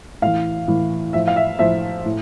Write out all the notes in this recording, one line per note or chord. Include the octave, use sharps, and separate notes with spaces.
A2 E3 F5
A2 E3
A2 F3 E5
F5
E5
A2 F3 E5
A2